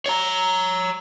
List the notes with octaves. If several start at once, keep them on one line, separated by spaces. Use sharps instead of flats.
C#5 A#5